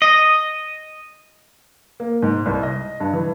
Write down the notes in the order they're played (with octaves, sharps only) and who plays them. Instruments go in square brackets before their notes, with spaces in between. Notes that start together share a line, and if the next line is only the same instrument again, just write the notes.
[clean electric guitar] D#5
[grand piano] A#3
G#2
C2
D#5
G2
E3